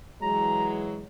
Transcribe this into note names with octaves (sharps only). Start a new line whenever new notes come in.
E3 F#3 G#3 A#5